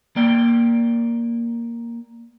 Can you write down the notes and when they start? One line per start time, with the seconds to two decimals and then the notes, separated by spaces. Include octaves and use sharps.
0.16 A#3 D5 G5